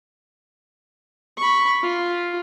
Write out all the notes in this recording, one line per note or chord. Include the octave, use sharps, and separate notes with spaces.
B5 C#6
F4